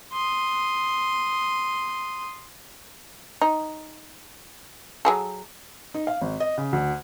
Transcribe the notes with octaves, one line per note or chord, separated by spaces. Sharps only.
C6 D#6
D#4
F#3 G#4 A4
D#4
F5
G#1
D#5
C#3
D2